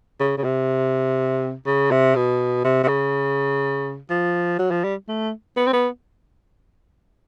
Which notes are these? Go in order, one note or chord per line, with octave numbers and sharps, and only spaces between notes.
C#3
C#3
C3
C#3
C3
B2
C3
C3
C#3
F3
F#3
F3
G3
A3
B3
C4
B3